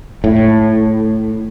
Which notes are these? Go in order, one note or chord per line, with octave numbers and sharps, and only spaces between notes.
A2